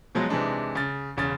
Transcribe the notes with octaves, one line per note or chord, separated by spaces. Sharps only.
B2 F3 F#3 G#3
C3 E3 G#3 D4 D#4
C#3 A6
E1 C#3 A6